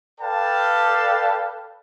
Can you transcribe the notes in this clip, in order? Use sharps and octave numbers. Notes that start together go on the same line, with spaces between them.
A4 B4 D5 F5 G5 A5